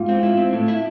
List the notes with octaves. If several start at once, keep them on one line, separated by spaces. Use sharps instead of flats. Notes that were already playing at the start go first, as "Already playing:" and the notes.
Already playing: G#2 F4
C4
E4
C4
A2
E4